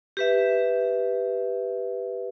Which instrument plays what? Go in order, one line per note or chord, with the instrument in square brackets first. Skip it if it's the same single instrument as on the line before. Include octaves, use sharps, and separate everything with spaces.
[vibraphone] G4 B4 E5